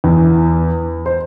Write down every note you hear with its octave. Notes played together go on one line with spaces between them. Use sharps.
E2
C5